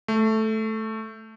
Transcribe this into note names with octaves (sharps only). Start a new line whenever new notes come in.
A3